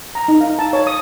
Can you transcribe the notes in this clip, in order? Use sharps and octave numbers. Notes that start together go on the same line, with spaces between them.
A#5
D#4
F5
A5
C#5
D#6